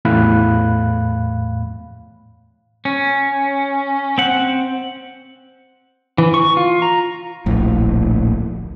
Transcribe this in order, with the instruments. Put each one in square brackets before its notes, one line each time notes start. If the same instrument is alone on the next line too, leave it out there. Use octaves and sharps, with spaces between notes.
[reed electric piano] E2 A2 F5 B5 F#6
[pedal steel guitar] C#4
C4 F#5
E3
C#6
F4
A#5
[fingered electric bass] D1 A#1 A2